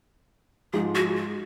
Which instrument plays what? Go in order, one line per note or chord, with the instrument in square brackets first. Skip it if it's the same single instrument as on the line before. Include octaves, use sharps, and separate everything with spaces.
[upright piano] G#2 F3 G#3 D#4 [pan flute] G#4
[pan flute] F#4
F4